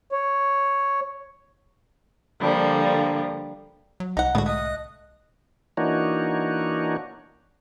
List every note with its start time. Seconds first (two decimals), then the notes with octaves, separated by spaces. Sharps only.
0.12 C#5
2.40 D3 F3 G3 A#3
4.00 F#3
4.17 C2 D#4 F#5
4.35 A2 D3 G#3 B3 F#4
4.46 A3 D#5 D#6 F#6
5.77 E3 A#3 D4 D#4 F#4 C#5